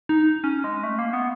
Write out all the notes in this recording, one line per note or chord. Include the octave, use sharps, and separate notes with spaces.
D#4
C#4
G#3
A3
A#3
B3